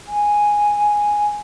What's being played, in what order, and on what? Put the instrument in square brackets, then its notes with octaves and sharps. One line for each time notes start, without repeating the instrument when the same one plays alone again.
[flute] G#5